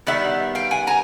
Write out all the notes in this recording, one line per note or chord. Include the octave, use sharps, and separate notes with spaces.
D#3 G3 B3 E5 F#5
F5 G5
F#5 G#5
G#5 A#5